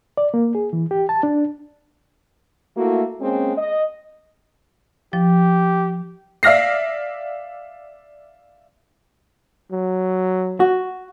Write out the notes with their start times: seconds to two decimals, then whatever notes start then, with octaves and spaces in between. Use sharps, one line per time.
0.18 D5
0.34 A#3
0.55 G#4
0.73 E3
0.91 G4
1.09 A5
1.23 D4
2.75 A3 A#3 E4 F#4
3.20 G#3 A#3 C4 C#4
3.57 D#5
5.13 F3 G4
6.43 D5 E5 F5 F6 A#6 C7
9.72 F#3
10.60 F#4